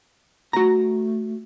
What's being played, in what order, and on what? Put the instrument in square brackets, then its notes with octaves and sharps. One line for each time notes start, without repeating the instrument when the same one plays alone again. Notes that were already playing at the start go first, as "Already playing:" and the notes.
[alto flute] A3 [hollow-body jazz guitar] F#4 A#5